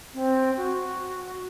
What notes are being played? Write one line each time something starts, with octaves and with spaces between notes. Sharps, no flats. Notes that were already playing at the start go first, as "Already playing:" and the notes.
C4
F#4